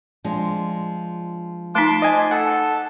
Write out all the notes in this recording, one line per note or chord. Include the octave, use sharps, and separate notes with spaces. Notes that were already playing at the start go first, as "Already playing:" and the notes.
F3 G#3 D4
A3 D#4 A5 C6 D6
C5 D#5 G#5
A4 F#5 A5